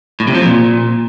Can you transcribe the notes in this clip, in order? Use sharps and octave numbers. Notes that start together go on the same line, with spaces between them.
A2
C3
F3
A#2